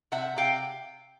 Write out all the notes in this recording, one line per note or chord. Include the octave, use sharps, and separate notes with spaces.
C3 E5 F#5
C3 F5 G5